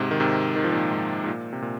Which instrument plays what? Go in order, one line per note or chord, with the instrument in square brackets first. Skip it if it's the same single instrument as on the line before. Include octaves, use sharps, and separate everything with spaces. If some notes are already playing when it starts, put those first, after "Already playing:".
Already playing: [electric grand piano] G#2 C3
D#3
G#2 C3
D#3
F3
A#2 D#3
G#2
G#2
A#2
C3
A#2